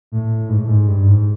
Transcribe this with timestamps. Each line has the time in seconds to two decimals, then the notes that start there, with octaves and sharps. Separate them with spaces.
0.12 A2
0.49 G#2
0.58 A2
0.67 G#2
0.88 G2
1.08 G#2